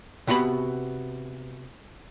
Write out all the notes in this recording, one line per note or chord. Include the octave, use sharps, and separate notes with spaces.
C3 B3 F#4 C#5 B5